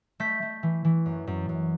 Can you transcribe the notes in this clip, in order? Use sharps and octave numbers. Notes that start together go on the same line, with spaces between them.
A3 G6 B6
A3
E3
E3
F#2
F#2
F#2